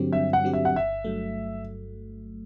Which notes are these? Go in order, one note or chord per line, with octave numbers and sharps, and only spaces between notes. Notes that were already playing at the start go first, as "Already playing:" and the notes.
Already playing: G2 D3 F#3 C4 G4
G2 E5
F#5
D3 F#3 C4 G4
E5
F#5
G1 E5
G2 F#3 A3